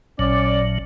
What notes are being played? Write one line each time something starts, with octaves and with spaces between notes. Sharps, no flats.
A1 A#2 F#3 C#4 D5